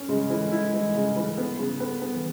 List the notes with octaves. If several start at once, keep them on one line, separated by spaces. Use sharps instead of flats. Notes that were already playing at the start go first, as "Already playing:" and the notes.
Already playing: C#4
C#3 G#3
E3
E4
E3
C#3
E3
B3
C#3
B3
B3
E3